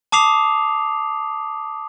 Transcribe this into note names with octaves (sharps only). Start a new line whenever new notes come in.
A5 D6 D#6 C7 F7